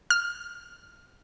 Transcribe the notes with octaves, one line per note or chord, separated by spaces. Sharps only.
F6